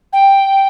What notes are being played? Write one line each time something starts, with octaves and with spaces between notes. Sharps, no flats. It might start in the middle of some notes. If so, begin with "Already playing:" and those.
G5